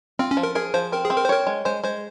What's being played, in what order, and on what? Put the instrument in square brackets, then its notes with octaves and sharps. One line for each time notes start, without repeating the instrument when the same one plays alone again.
[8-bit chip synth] C4 [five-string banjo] F4
[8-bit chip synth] C#4
[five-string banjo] F3
[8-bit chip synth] A#4
[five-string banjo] G#4 [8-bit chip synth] A#4
[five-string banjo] F3 [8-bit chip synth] C5
[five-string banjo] C4 [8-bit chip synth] A#4
[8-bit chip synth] G#4
[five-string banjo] C4
[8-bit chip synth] A#4
C5
[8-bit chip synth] A#4 [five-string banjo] C#5
[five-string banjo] G#3
[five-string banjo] G#3 [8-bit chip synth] C5
[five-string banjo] G#3 [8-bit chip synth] C5